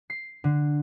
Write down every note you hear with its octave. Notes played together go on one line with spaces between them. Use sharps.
C7
D3